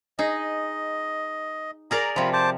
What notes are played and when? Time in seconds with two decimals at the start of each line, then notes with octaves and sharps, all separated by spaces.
0.19 D#4 G#4 D#5
1.91 G#4 A#4 D5 A#5
2.16 C3 F3 F4 B5
2.33 C5 A5 D6